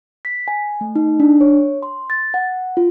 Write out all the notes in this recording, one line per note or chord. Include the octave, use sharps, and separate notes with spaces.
B6
G#5
A3
D#4
D4
C#5
C6
A6
F#5
F4